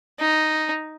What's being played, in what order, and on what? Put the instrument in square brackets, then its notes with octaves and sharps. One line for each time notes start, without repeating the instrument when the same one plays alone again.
[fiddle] D#4